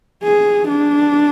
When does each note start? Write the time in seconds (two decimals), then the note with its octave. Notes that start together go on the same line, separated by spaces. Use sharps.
0.24 G#4
0.68 D4